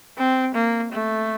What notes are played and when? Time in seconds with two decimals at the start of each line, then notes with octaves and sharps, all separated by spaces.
0.18 C4
0.55 A#3
0.92 A3